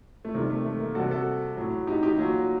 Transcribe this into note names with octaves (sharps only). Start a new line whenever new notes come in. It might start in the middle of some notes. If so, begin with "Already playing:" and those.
A3
C3 D#3 G3 A#3
A3
A3
A#3
C3 G3 F#4 A4
F#4 A4
A2 F#3
D#4 G4
D#4 G4
A#2 F#3